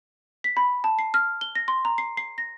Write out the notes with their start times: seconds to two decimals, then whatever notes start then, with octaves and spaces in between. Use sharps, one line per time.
0.44 B6
0.57 B5
0.84 A5
0.99 C7
1.14 F6
1.41 G7
1.55 A#6
1.68 C6
1.85 A#5
1.98 C7
2.17 C7
2.38 A#6